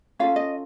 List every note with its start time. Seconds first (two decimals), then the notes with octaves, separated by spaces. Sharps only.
0.19 C#4 F4 A4 F5
0.36 D#5